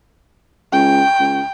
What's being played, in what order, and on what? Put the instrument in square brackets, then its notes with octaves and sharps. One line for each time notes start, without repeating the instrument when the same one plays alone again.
[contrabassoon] C#2 [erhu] G5
[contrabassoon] C#2